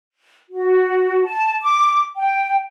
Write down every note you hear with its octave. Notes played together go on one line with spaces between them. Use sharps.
F#4
A5
D6
G5